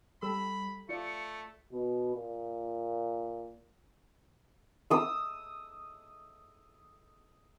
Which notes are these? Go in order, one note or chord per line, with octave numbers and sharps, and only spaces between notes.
G3 G4 A4 B5 E6
A3 F4 D5 C#7
B2
A#2
D#6 E6